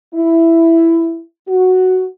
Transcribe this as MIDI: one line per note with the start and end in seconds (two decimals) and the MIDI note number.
0.15 1.20 64
1.48 2.04 66